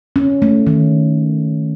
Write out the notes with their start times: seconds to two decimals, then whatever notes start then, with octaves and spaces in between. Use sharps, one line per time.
0.16 C#4
0.42 A3
0.67 D#3